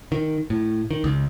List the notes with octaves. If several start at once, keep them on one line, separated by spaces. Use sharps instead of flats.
D#3
A2
D#3
C#2